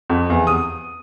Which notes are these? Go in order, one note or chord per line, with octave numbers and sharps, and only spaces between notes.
F2
E2
D#6